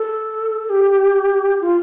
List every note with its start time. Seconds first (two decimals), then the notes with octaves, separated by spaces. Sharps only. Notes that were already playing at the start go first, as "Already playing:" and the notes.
Already playing: A4
0.70 G4
1.61 F4